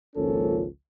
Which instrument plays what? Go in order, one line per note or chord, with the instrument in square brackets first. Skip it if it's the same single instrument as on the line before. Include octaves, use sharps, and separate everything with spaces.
[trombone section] G#1 C#2 F3 A#3 C#4 A4